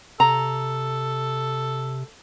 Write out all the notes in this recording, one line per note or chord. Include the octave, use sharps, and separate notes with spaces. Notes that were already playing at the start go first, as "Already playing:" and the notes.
C3 A4 A#5